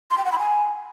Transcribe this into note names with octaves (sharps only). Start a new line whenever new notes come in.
C6
G5
F#5
B5
G#5